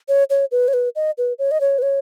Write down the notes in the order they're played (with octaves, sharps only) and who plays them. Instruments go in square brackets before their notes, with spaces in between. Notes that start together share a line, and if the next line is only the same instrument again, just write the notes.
[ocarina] C#5
C#5
B4
C#5
B4
D#5
B4
C#5
D#5
C#5
B4
C#5